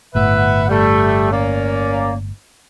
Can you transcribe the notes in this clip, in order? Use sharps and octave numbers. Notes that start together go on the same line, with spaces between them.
G1 A2 B4 E5 F#5
G3 A3
A#3 C#4 D5